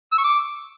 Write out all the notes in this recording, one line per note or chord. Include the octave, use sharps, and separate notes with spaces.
E6
C#6
D6